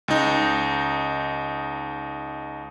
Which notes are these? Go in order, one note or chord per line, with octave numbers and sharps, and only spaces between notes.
C#2 D#4